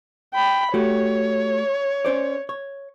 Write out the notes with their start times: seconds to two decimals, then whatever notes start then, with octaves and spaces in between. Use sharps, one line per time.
0.35 G5 B5
0.74 A3 F#4 G4 C#5
2.05 C#4 C5 D5
2.49 C#5